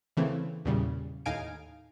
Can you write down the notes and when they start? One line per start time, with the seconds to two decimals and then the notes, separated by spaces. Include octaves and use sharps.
0.17 C#3 E3 A3 A#3 C4
0.65 E2 A#2 C#3 G3
1.26 D#2 A2 D#4 F5 G#5 D7